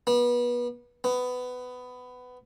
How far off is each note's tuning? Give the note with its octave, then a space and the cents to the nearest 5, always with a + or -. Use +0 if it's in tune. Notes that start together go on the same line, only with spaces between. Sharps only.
B3 -30
B3 +15